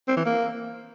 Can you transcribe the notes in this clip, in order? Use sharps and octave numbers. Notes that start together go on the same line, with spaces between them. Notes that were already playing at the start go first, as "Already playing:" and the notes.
C4
E3
A#3